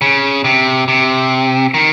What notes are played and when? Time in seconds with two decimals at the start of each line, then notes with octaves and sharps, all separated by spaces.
0.01 C#3
0.44 C3
0.88 C3
1.74 D#3